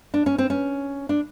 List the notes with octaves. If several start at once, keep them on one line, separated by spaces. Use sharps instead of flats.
D4
C#4
C4
C#4
D4